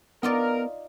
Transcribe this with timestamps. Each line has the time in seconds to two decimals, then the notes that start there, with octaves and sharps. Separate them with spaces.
0.23 B3 D#4 F4 A#4 D5